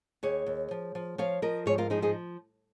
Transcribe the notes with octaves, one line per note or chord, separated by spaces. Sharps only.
D#2 G#4 C#5
D#2
F3
F3
F3 C#5 F5
F3 A#4 D#5
G#2 G#4 C#5
F4 A#4
F3 D#4 G#4
D#4 G#4